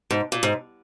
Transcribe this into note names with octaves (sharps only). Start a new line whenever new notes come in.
G#2
A#2
G#2